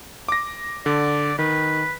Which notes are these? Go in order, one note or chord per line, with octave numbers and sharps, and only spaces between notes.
D6 A#6
D3 D5
D#3 B4